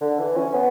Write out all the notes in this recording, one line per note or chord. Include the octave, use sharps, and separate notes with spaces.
D3
E3
C#4
B3